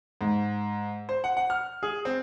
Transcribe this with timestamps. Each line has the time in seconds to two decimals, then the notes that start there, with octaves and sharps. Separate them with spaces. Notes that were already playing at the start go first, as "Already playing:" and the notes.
0.21 G#2
1.09 C5
1.24 F#5
1.37 F#5
1.50 F6
1.83 G#4
2.05 C4